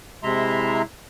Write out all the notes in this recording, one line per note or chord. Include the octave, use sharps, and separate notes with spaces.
C3 G#3 E4 E5 A#5 C6